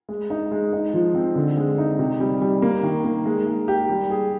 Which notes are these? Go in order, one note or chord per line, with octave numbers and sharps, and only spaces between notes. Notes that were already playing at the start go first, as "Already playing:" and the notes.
G#3
D#4
G#3
D#4
F3
C4
D3
G#3
D#4
C3
G3
G3
A#3
D#3
A#3
G#3
G#3
G4
G3
G#4